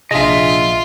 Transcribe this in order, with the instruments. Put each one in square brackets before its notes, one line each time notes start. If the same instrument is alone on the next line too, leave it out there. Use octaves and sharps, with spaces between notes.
[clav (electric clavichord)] A#1 G#4 [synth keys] C3 D4 [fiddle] F4 [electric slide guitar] D#5 E5